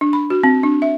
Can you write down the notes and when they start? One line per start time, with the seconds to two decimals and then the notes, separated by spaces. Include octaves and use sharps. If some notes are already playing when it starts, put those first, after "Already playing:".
0.01 D4
0.13 B5
0.30 F#4
0.43 C4
0.63 D4
0.82 E5